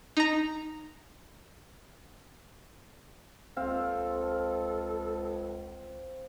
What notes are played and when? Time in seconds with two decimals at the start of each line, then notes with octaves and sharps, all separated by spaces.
0.17 D#4 A#5
3.57 C#2 C4 A4 F5